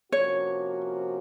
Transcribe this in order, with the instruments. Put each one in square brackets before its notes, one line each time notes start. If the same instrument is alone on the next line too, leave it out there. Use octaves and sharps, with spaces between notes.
[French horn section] C3 F3 A#3 C#4 F#4 [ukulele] C#5